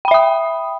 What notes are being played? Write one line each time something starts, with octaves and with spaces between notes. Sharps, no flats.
E5 G5 B5 D#6